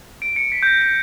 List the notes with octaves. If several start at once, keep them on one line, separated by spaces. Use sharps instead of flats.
D7
C#7
B6
G6
A#6
G6